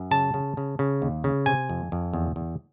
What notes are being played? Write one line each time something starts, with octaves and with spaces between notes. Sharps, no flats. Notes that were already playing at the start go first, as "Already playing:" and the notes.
Already playing: F#2
C#3 A5
C#3
C#3
C#3
D#2
C#3
C3 G#5
F2
F2
E2
E2